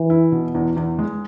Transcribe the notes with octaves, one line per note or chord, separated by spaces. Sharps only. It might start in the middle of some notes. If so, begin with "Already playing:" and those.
Already playing: E3
E4
B2
E2
E2
G#3